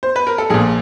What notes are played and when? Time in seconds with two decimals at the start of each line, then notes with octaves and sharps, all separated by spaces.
0.03 C5
0.16 B4
0.27 A#4
0.38 A4
0.50 A#1 A#2 G#4